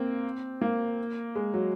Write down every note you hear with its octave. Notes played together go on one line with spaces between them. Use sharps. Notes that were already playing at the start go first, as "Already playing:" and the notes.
Already playing: A#3 C4
A#3
G#3
F#3